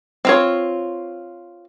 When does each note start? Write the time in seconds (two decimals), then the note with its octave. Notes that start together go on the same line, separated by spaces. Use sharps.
0.25 C4 F4 C#5